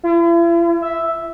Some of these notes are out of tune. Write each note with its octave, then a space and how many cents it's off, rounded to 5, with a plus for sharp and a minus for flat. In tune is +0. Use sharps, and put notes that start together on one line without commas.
E4 +45
E5 +0